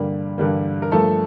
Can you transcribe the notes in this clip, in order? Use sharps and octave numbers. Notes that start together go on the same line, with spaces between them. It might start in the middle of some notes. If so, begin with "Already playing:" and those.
Already playing: G2 D3 G3 A#3
G2 D3 G3 A#3
A#4
G2 F3 A3 A#3 A4